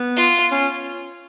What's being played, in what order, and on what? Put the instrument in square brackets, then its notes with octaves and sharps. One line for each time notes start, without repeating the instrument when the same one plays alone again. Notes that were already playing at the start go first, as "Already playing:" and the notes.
Already playing: [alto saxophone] B3
[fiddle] F4
[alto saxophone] C#4